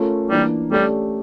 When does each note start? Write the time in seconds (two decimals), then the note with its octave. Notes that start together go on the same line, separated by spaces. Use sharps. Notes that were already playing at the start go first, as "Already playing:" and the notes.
Already playing: A3 C#4 F4 A#4
0.30 E3 G3 A#3 D4
0.71 G3 A3 C#4 G4 D5